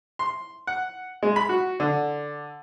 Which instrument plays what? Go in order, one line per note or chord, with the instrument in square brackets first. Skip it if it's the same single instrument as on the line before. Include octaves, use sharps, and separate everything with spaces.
[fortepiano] C6
F#5
G#3
B5
F#4
D3